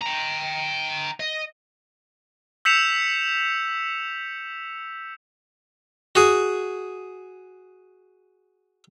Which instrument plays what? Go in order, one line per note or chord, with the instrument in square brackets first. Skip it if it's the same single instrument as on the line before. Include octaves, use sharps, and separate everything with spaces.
[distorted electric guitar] G5 A#5
D#5
[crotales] E6 G6 B6 C#7 E7 F7
[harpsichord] F#4 G#4